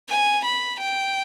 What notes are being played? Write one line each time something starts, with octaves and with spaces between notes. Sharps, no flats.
G#5
B5
G5